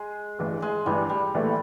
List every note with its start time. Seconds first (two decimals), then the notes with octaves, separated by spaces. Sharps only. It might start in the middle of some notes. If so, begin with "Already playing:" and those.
Already playing: G#3
0.39 A1 G2 E3
0.62 G#3
0.86 A1 G2 E3 G3
1.09 G3
1.34 A#1 A2 E3 A3